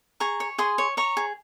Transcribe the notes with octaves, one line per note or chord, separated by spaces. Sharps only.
G#4 A#5 C#6
C#5
G#4 C6 D#6
C#5
C#5 A#5 C#6
G#4